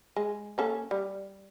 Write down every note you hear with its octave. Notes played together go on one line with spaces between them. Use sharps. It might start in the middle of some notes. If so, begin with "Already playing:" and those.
G#3
A#3 C#4 A4
G3